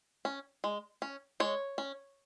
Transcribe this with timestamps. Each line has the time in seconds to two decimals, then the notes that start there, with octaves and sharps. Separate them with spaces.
0.25 C#4
0.64 G#3
1.02 C#4
1.40 G#3 C#5
1.78 C#4